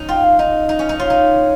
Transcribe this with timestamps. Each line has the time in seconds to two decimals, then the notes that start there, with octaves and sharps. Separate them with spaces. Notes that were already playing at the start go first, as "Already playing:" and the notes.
Already playing: C#4 D#4
0.09 F4 G5
0.24 F5
0.39 D#4 D#5
0.69 D#4
0.79 C#4
0.89 D#4
0.99 F4 C#5
1.10 D#4